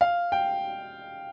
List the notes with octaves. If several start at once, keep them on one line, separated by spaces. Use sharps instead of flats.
F5
G5